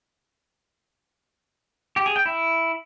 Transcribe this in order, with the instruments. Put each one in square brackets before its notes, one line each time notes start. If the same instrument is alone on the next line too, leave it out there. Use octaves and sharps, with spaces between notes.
[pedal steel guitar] G4
G#4
G5
E4